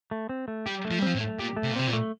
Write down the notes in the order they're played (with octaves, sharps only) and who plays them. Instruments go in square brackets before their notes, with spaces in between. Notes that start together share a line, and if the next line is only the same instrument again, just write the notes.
[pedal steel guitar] A3
C4
A3
[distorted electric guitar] G3 [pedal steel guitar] G4
[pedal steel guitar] A3
[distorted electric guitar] F3
G3
[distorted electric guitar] F3 [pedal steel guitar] C4
[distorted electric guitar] A2
[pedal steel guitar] A3
[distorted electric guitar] A#2 [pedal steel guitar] G4
[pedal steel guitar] A3
[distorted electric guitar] C3
A#2
[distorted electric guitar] C3 [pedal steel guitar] C4
[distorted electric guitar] A#2
[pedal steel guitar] A3